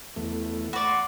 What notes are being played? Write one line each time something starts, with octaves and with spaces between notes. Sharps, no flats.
E2 A3
F#4 D5 B5
C6